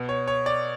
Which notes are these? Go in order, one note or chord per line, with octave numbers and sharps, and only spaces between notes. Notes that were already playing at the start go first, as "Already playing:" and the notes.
Already playing: B2
C#5
C#5
D5